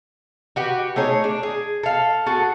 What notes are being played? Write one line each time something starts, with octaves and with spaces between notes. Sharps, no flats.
F#4 G4 B4
A3 D#4 G#4 C#5
D4
G#4
A4 F5
F#4 G#4 A4